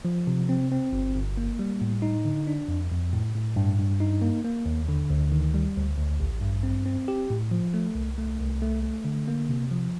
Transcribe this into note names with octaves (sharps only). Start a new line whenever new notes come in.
F3
C3
C4
C4
G1
G1
A#3
G3
A2
D#4
D3
D4
F2
F2
A2
A2
G2
G2
D#4
A#3
A#3
D#2
D3
D2
D#3
G3
D2
D2
A1
G2
C4
C4
G4
A2
F3
A3
C2
A3
C2
A3
A3
D3
A#3
C3
F3